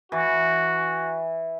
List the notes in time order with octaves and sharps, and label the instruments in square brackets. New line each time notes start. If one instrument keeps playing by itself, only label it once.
[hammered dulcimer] E3 [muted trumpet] F#4